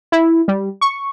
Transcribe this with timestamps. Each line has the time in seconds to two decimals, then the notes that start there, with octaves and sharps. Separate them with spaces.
0.12 E4
0.48 G3
0.81 C#6